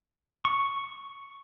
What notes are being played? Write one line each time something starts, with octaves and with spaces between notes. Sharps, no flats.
C#6